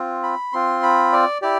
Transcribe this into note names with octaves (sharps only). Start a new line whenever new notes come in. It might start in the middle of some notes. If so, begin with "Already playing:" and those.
Already playing: C4 F4
B5
C4 F4 C6
B5
D5
E4 G4 D5